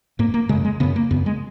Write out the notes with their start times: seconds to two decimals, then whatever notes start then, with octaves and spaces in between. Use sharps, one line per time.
0.19 G#2 A#3
0.34 A#3
0.49 C#3 G#3
0.52 F#2
0.65 G#3
0.80 C#3 B3
0.83 F#2
0.96 A#3
1.11 F#2 C#3 B3
1.26 G#3